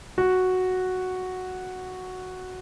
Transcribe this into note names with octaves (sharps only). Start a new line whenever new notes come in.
F#4